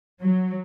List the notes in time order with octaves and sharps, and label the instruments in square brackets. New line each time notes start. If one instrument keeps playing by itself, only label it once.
[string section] F#3